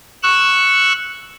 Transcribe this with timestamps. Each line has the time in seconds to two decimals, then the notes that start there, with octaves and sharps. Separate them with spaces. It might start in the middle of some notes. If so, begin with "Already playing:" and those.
0.23 C#6 E6 F#6